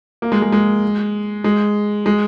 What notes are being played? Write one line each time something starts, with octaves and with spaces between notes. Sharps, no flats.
A#3
G#3
G#3
G#3
G#3
G#3